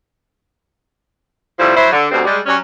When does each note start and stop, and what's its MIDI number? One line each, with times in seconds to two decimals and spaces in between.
1.59 1.74 48
1.59 1.74 53
1.59 1.74 55
1.59 1.74 57
1.59 1.74 64
1.75 1.88 54
1.75 1.88 64
1.75 1.88 72
1.92 2.07 50
2.11 2.23 38
2.11 2.23 43
2.11 2.23 47
2.11 2.23 60
2.25 2.38 55
2.25 2.38 56
2.46 2.56 54
2.46 2.56 55
2.46 2.56 61